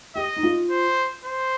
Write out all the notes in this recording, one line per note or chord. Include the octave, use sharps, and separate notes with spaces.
G4 D#5
D#4
F4
C5
C5